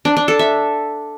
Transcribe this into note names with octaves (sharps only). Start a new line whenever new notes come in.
D4
D4
A4
E5